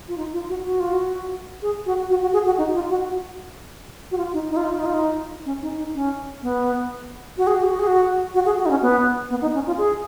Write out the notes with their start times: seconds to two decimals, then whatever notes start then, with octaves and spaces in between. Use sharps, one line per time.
0.08 F4
0.17 D#4
0.33 F4
0.49 F#4
0.66 F#4
0.80 F4
0.93 F#4
1.62 G#4
1.86 F#4
2.10 F#4
2.21 F#4
2.33 G#4
2.46 F#4
2.58 D#4
2.74 F4
2.90 F#4
4.11 F#4
4.17 F4
4.33 D#4
4.50 D#4
4.57 F4
4.64 D#4
4.71 F4
4.79 D#4
4.86 F4
4.94 D#4
5.46 C#4
5.62 D#4
5.78 D#4
5.94 C#4
6.42 B3
7.38 F#4
7.47 G#4
7.55 F#4
7.63 G#4
7.70 F#4
7.79 G#4
7.87 F#4
8.34 F#4
8.46 G#4
8.58 F#4
8.66 D#4
8.70 C#4
8.82 B3
9.30 B3
9.42 D#4
9.55 C#4
9.67 F4
9.78 G#4